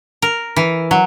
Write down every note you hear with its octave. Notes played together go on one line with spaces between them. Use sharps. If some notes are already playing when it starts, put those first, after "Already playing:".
A#4
E3
F#3